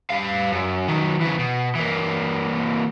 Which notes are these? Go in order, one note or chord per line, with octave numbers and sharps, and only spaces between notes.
G3 F5
F#2
D#3 F#3
C#3 E3
B2
E3 A#3